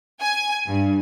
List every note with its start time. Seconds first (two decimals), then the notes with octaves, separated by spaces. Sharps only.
0.20 G#5
0.67 G2